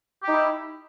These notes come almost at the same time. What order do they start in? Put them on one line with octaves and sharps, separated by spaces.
G4 D#4 E4